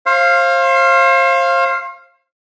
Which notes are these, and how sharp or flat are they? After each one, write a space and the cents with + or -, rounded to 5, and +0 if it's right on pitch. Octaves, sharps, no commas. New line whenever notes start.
C5 +35 F5 -10